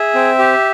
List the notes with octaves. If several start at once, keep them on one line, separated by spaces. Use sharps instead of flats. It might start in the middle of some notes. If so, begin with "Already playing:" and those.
Already playing: G#4 E5
C4
G4